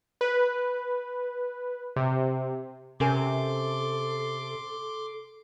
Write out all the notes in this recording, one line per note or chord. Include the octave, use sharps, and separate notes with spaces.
B4
C3
C3 C#4 A4 A#4 G#5 C6 D6